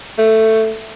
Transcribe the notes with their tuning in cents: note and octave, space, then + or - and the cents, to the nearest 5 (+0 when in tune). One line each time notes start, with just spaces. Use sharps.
A3 +10